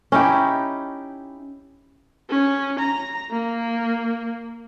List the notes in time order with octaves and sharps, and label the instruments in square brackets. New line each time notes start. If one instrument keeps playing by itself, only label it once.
[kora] C#4 D#4 E4 G4
[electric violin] C#4
A#5
A#3